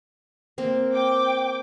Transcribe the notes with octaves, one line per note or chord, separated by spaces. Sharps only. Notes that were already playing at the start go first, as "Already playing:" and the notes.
A#3 C4 A#4
G5 D6